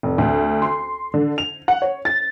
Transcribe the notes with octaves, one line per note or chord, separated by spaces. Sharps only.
F1
D2
C6
D3
F7
F#5
C#5
A6